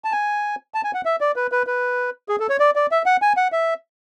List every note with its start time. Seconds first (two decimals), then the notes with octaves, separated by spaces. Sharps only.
0.04 A5
0.12 G#5
0.74 A5
0.84 G#5
0.94 F#5
1.05 E5
1.21 D5
1.36 B4
1.52 B4
1.67 B4
2.29 G#4
2.40 A4
2.49 C#5
2.60 D5
2.76 D5
2.91 E5
3.06 F#5
3.22 G#5
3.37 F#5
3.52 E5